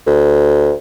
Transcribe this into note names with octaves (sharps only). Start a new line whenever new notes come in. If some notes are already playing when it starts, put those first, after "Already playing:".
D2